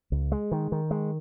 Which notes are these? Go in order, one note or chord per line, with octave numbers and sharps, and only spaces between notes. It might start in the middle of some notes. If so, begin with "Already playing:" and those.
C#2
G#3
D#3
D#3
G#3